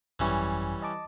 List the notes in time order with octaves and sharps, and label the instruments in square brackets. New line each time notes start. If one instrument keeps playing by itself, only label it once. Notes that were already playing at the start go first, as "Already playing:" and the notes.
[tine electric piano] G#1 F#2 [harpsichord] E3 G3 C#4
[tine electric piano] D#5 A5 D6